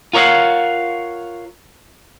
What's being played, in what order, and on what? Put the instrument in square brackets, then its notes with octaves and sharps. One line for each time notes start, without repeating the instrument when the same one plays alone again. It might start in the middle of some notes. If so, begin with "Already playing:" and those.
[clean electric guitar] F4 A#4 C#5 D#5 F5 F#5